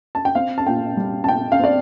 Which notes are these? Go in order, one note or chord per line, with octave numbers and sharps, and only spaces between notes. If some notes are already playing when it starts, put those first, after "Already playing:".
A5
G5
C4 F5
A5
A#2 G5
G3
A5
A#2 G5
F5
C4 D5